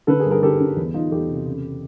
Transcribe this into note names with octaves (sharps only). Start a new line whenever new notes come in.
D3 A4 B4
G#4 A#4
G2
G#4 A#4
D3 G4 A4
D3
E2
E2 D#4 F4
E2 G4 A4
C3
C#3